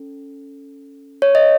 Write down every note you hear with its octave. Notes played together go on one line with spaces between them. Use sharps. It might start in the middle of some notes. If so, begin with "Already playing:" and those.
Already playing: C#4 A4
C#5
D#5